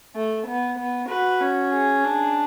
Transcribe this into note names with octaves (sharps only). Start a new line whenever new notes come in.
A3
B3
B3
F#4 B4
C#4
G#4
D4